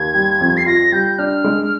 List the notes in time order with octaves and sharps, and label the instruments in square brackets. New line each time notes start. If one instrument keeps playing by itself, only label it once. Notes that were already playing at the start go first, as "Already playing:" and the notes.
Already playing: [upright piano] D#2 [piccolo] G#6
[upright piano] G3
F2
[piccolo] C7
[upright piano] F4 [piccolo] A#6
[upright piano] G3 [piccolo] G6
[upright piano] D4 [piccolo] F6
[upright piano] G#3